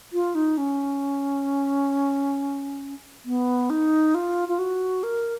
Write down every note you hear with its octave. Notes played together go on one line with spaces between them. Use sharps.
F4
D#4
C#4
B3
D#4
F4
F4
F#4
A#4